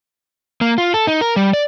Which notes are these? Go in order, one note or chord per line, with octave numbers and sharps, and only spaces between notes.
A#3
F4
A4
D#4
A#4
G3
D5